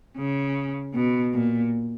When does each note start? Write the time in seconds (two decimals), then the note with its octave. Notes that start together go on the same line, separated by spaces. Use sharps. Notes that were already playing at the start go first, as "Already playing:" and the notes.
0.17 C#3
0.94 B2
1.33 A#2